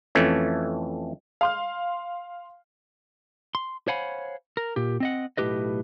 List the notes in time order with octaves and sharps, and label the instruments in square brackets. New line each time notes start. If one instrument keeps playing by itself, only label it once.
[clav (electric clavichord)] F2 E3 A3 C#4
[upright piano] F5 C6 F6
[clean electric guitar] C6
C5 C#5 F5 F#5 G#5 B5
A#4
A#2 G4
C4 D#5 F#5
B1 A2 G4 B4 D#5